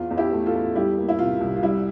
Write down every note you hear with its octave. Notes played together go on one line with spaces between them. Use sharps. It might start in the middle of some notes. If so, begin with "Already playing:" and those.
Already playing: E2 F4
E2
E4 G4
A3
F4 A4
E2
G3 E4 G4
A#3
E4
C3 F4
C2
F4
G3 E4